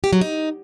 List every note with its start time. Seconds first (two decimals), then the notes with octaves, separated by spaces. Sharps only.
0.04 G4
0.13 F#3
0.21 D#4